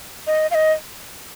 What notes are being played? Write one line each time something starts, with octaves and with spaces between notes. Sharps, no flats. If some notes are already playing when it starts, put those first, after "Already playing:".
D#5
F5
D#5